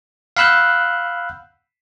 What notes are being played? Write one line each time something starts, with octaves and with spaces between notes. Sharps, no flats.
F5 F#5 B5 E6 F#6 G6